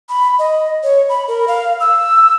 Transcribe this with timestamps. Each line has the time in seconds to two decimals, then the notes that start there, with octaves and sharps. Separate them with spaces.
0.09 B5
0.39 D#5
0.83 C#5
1.09 B5
1.28 A#4
1.48 F5
1.80 E6